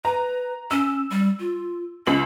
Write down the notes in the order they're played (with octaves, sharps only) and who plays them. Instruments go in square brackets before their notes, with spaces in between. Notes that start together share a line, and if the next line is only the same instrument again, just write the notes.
[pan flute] B4 [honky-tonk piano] A#5
[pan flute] C#4 [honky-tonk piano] E6
[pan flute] G3
F4
[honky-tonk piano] C#2 F#7 [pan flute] C#4